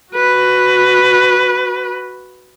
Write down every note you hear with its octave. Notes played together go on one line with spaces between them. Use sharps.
F#4 B4